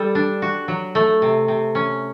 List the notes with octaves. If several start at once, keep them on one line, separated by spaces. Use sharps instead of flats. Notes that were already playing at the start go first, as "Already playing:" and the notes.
Already playing: G3 A4
D4
F#4
F#3
A3
C3
C3
C#4